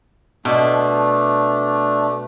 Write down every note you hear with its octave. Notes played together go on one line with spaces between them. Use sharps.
B2 A3 D4